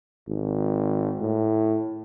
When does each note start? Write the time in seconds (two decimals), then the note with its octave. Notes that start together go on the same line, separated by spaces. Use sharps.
0.28 G#1
1.21 A2